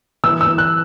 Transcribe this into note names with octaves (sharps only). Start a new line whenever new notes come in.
E3 E6
E6
E3
F#6